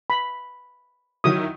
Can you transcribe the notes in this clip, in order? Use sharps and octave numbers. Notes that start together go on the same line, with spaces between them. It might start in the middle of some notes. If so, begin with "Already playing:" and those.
B5
D#3 F#3 E4 D#6